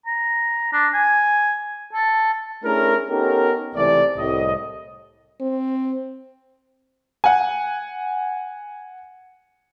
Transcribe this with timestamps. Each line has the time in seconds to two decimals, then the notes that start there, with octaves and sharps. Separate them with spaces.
0.06 A#5
0.73 D4
0.93 G#5
1.93 A4
2.64 A3 C#4 D4 E4 G#4 A#4
3.10 B3 C#4 D#4 G4 A4 A#4
3.76 C#2 C3 E3 A3 D5
4.18 C2 A2 D#5
5.41 C4
7.24 F#5 G#5